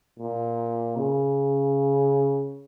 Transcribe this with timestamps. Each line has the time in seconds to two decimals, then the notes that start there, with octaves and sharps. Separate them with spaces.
0.19 A#2
0.96 C#3